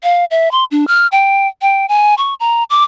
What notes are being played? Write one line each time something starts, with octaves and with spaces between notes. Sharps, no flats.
F5
E5
C6
D4
F6
G5
G5
G#5
C#6
A#5
D6